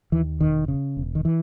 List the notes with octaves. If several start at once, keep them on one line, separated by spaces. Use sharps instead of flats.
D#2 E3
E1 D#3
C#3
E1
D#3
E3